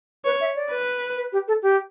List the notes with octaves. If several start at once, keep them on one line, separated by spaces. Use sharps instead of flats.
B4 C#5
E5
D5
B4
B4
G4
A4
G4